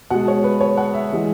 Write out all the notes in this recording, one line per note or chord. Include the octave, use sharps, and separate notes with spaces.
B2 G#3 F#5
C#5
B4
C#5
F#5
E5
E3 G#3